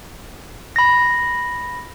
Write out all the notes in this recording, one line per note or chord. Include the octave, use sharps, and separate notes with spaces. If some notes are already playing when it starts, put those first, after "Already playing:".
B5 A#6